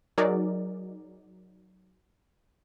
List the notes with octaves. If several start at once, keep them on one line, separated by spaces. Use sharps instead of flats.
F#3 D#4 G#4 A#4 D5